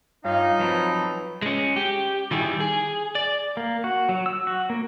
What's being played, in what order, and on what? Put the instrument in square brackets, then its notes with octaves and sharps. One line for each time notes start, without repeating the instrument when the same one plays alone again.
[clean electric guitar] G2 [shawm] D#4 [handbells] F4 C#5 G5 [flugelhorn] F5
[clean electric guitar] F3 F#3 C4 [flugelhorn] B4
[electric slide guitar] G#3 C#4
G4
D#3 G3 E4 G4 G#4
G#4
D5
[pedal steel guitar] A#3
F#4
F#3
E6
F#4
A#3